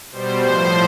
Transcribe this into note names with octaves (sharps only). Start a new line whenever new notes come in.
B2 G3 C5
A2 F3